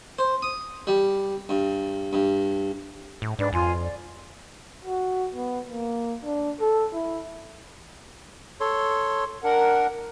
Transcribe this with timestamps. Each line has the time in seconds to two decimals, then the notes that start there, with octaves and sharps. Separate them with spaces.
0.19 C5
0.42 D#6
0.87 G3
1.49 G2
2.13 G2
3.22 A2
3.39 G#2 D4 B4 D5
3.53 F2 F4 G#5 C6
3.82 D5
4.85 F#4
5.35 B3
5.66 A#3
6.24 D4
6.61 A4
6.94 E4
8.60 A4 C#5 C6
9.44 D4 A#4 F#5